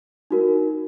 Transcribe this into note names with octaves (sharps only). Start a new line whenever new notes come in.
D#4 F#4 A#4